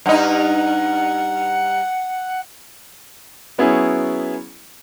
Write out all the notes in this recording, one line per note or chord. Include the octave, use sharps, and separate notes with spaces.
G2 D#4 F#5
F#3 B3 C#4 E4 G#4